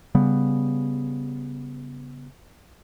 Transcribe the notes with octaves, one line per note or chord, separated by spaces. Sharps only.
C#3 G3 B3